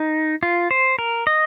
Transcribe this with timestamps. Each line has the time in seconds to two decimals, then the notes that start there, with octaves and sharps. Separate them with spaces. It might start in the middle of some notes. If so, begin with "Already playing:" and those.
Already playing: D#4
0.43 F4
0.71 C5
0.99 A#4
1.27 D#5